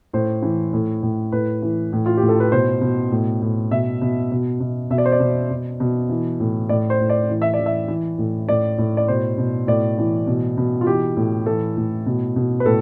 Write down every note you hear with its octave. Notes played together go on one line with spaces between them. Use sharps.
A2 C5
E3
A2
A2
A2 B4
E3
A2
F4
G4
A2
A4
B4
B2 C5
B2
A2
A2
B2 E5
B2
B2
B2
B2 E5
D5
C5
D5
B2
B2
B2
E3
A2
A2 D5
C5
A2
D5
E3
E5
D5
E3
E5
E3
A2
A2 D5
A2
D5
B2 C5
B2
A2 D5
E3
B2
B2
F4
E3 G4
A2
E3 A4
A2
B2
B2
B4
A2 A4